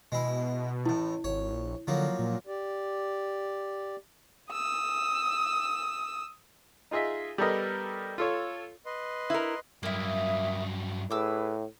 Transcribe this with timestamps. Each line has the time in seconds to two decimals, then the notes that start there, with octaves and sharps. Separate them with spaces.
0.12 B2 G#3 E4
0.86 A1 A2 E4
1.24 G#1 C#5
1.52 A#1
1.87 D3 F3 F#3 A#3
2.19 A#2
2.47 G4 D5
4.51 D#6 E6
6.91 D#4 F4 G#4 D#5 E5
7.38 G3 B3 A4 A#4 D#5
8.18 F4 A4 C#5
8.86 B4 D#5 C6
9.30 E4 A#4
9.83 G2 F#3 A#3 E4 E5 D#6
11.11 A2 G#4 B4 D6 E6